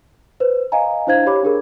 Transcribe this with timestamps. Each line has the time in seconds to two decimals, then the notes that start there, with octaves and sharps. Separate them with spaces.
0.40 B4 C5
0.72 D#5 F5 G#5 A#5
1.07 D4 E4 C5 F5 G#6
1.26 G4 C#5 B5 D6
1.43 D4 G#4 A#4